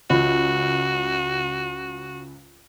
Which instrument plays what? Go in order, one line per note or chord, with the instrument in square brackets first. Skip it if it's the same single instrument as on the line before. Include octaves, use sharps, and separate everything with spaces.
[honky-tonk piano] C#2 [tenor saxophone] F#4